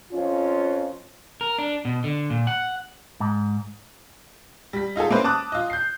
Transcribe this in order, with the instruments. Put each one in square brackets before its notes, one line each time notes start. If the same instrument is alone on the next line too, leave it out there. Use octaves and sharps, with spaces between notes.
[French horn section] F2 C#4 F4
[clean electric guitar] A#4
D4
B2
D3
A#2
F#5
G#2
[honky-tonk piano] G3 B6
D#4 F4 G#4 A4
A#3 B3 C#4 E4 B4 C5
A5 D6 D#6 F#6
F4 D#5
G6 C7